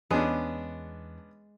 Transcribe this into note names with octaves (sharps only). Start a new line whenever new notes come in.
E2 G#3 B3 C#4 D4